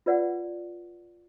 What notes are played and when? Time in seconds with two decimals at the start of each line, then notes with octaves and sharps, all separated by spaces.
0.06 F4 B4 D5 F#5